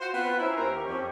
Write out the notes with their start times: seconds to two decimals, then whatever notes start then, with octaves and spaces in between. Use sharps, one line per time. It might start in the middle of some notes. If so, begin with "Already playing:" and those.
0.01 F4 F#4 C5
0.14 B3 C4 F4 B4
0.39 C#4 E4 C5 A#5
0.57 D#2 A#4
0.75 C#4 G4 C#6
0.88 F2